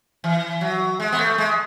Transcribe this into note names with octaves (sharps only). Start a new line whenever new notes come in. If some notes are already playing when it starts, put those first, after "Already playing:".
E3
F#3
G#3
B3
A3
G#3